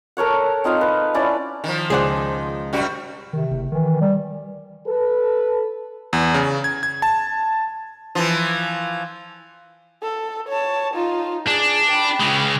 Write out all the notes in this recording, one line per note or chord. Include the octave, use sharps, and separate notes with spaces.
A4 A#4 C#5 F#5
C4 D#4 F4 F5
B4
C#4 E4 D5
D#3 F3
C#2 G#4 C5 D5 F#5
F#2 G3 F#4
C3 D#3
F#1
D#3 E3
G3
A4 B4
E2
C#3
G#6
G#6
A5
E3 F3
A4
C#5 A5
D#4 F4
D4 G#4
G5 B5
C#3 G#3